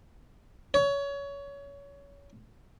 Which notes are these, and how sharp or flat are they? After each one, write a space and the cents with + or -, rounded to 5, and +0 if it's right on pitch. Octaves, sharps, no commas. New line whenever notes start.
C#5 +25